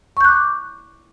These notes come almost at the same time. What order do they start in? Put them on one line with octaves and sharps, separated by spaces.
C#6 G6 F#6 D6